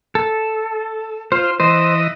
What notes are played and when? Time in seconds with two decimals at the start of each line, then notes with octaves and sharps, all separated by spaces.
0.15 A4
1.32 F4 C5
1.60 E3 C5 D#5